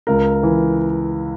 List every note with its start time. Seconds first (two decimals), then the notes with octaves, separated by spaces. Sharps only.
0.07 C#2 A#4
0.43 E3